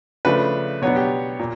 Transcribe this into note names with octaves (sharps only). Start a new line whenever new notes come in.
C#3 F3 A3 D4 B4
B2 F#3 B3 D4 C#5
G4
A#2